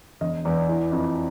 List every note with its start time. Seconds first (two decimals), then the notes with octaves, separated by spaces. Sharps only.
0.21 E1 D#5
0.45 E2
0.68 E3
0.92 F2